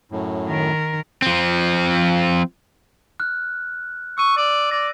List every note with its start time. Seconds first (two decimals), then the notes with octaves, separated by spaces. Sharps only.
0.12 F#2 A2
0.48 D#3 A#4
1.22 F3 C4
3.20 F6 F#6
4.18 C#6 E6 D#7
4.37 D5
4.71 D5 A#6